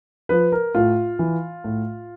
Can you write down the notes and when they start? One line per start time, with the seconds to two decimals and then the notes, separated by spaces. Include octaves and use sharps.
0.29 F3 B4
0.52 A#4
0.75 A2 F4
1.19 E3
1.64 A2